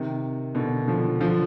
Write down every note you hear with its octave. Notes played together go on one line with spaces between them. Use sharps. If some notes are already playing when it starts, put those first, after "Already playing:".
Already playing: C3 D#3
B2 D3
D3 F3
D3 F3